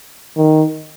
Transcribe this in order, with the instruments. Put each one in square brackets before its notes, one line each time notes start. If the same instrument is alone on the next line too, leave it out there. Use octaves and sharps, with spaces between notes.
[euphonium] D#3